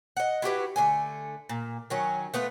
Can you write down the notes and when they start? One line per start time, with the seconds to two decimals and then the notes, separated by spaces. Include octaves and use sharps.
0.17 D#5 F#5
0.42 E4 F#4 G4 B4
0.76 D3 A3 G#5
1.49 A#2
1.90 D#3 F#3 C#4
2.34 A3 B3 F4 B4